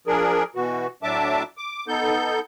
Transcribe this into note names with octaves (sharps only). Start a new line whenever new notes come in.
F3 D4 G#4 A#4
B2 E3 F#4
A2 F#3 D4 E5 A5 D6
D6
B3 D#4 A4 G6